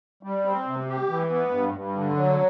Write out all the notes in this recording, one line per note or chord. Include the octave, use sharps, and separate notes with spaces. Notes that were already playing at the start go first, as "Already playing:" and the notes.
G3
C4
C3
G4
E3
B3
G2
G2
D3
F#3